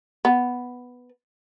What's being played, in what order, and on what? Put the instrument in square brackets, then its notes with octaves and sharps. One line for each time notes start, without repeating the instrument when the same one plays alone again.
[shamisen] B3